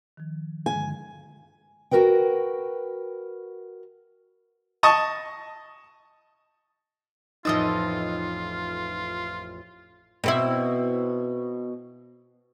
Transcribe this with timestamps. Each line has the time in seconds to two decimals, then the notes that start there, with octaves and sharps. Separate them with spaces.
0.17 D#3 F3
0.66 G2 D3 G#3 G#5
1.91 F#4 G4 A#4 B4 G5
4.83 D#5 A5 C#6 D#6
7.45 A1 F2 D#4 F4 D#5 D#6 E6 A6
10.24 B2 C4 E4